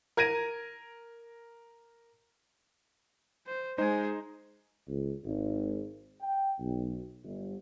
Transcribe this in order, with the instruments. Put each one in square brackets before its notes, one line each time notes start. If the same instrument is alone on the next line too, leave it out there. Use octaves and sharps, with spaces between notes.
[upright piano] A#4 G#6 A#6 D7 D#7
[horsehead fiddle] C5
[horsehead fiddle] G#3 G#4 [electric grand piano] D#4 C5
[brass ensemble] C#2
G#1
G5
B1
G1